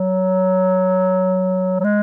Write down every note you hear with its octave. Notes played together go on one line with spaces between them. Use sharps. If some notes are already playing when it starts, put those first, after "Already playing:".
Already playing: F#3
F#3
G#3